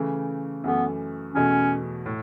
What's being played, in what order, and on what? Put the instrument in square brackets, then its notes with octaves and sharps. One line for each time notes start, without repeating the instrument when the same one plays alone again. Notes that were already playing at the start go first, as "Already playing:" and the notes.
Already playing: [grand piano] C#3 E3 A3
[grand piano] F#2 E3 A3 [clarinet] B3
[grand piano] E2 B2 A3 [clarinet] C#4
[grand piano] A2